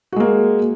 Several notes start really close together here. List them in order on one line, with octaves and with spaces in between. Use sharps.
F#4 G#3 A#3